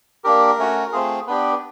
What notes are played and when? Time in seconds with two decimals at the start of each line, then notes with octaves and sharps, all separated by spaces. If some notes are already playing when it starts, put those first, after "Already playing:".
0.24 A#3 D4 G4 A#4
0.59 A3 C#4 F#4
0.92 A3 C4 F4 G#4
1.27 B3 D4 G4 B4